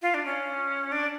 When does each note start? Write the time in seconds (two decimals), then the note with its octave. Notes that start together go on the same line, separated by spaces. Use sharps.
0.02 F4
0.14 D4
0.25 C#4
0.92 D4